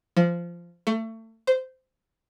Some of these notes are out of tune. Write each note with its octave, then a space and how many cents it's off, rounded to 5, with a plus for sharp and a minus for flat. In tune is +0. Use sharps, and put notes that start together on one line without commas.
F3 -15
A3 +30
C5 -15